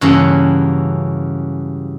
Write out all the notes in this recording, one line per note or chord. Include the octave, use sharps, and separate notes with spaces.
G2 C#3 E3 F#3 A#3 C#4